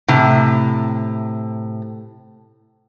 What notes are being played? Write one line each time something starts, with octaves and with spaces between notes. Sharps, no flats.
A2 C3